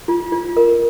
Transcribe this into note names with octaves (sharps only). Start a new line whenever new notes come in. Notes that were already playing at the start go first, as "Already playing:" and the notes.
F4
F4
A#4